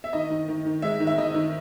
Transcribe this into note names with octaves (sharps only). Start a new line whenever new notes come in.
E5
D#3 D#5
D#3
D#3
D#3
G#3 E5
D#3
E5
D#3 D#5
D#3